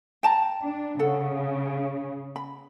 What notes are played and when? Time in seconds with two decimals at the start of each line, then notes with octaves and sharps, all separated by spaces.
0.23 G5 A5 A#5
0.63 D4
0.99 C#3 A4 F#5
2.36 B5